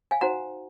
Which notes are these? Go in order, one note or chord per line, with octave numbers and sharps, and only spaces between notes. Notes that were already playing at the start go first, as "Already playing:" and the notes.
F5 G#5
D#4 F#4 C5 F#5 A#5